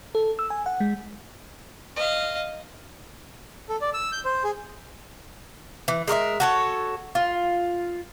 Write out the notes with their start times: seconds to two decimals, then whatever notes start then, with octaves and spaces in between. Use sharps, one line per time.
0.15 A4
0.39 E6
0.50 G#5
0.66 F#5
0.80 G#3
1.96 D#5 F5
3.69 A4
3.81 D5
3.94 E6
4.12 G6
4.25 C5
4.44 G#4
5.88 E3
6.08 G#3 A#4 D5 E5
6.40 F#4 A4 C#5
7.15 F4